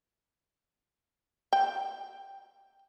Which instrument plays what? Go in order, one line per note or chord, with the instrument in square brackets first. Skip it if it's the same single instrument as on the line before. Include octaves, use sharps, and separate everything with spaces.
[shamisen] G5